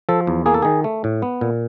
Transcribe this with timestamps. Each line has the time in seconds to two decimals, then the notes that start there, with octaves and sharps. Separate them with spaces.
0.09 F3 A4
0.27 E2
0.46 A#3 G#4
0.54 A4
0.62 D#3 G#4
0.84 A3
1.04 A2
1.22 B3
1.41 A#2